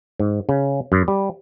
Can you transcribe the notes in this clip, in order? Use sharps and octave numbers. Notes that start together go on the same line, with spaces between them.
G#2
C#3
F#2
G3